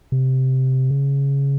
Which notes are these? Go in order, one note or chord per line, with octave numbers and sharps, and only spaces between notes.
C3
C#3